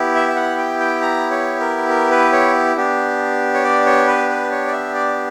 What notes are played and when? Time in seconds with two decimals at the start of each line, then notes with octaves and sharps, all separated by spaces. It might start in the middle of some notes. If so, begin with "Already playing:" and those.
Already playing: B3 E4 G4
0.15 E5
0.28 E5
0.36 F#5
0.58 G5
0.80 G5
1.02 A#5
1.31 C#5
1.60 A#4
1.89 A#4
2.11 B4
2.33 C#5
2.76 B3 D4 G4
3.54 C#5
3.64 D5
3.86 C#5
4.07 B4
4.29 B4
4.51 C#5
4.67 D5
4.72 E5
4.95 D5